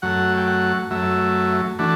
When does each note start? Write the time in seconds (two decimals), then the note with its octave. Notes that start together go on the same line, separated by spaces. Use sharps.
0.02 F#2 F#3 A3 F#5
0.38 G5
0.47 F#5
0.91 F#2 F#3 A3 E5
1.79 E3 A3 D4 F#4